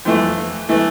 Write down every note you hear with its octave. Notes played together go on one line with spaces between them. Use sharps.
F2 E3 A3
E3 A3